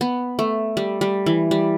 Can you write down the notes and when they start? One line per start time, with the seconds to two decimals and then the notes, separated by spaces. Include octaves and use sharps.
0.01 B3
0.39 A3
0.77 G3
1.01 G3
1.26 E3
1.51 G3